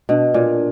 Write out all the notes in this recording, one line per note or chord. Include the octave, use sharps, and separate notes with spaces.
B2 D4
A#2